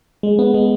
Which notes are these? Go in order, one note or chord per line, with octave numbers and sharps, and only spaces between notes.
G#3
B3
G#3